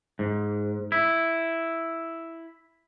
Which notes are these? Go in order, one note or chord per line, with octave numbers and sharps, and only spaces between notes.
G#2
E4